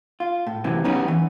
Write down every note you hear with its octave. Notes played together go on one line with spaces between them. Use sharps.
F4
A2
F#2 C3 E3
F#3 G3 B3 C#4 D#4
E3